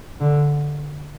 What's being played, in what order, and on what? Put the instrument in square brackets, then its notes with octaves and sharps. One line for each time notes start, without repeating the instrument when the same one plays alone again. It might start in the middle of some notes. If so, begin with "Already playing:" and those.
[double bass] D3